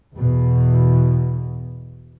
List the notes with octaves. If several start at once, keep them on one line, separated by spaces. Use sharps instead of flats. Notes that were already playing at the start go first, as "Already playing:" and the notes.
E2 B2